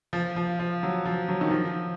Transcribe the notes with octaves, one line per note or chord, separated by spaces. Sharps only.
F3
F3
F3
F#3
F3
F#3
D#3
F3